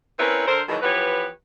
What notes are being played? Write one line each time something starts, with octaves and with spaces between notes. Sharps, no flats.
C4 C#4 E4 A#4 B4 C#5
D3 D4 A#4 C5
B2 D#3 E3 F#3 G#3
E3 F3 B3 G4 B4 C#5